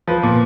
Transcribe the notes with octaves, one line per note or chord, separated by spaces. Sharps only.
F3 B4
A#2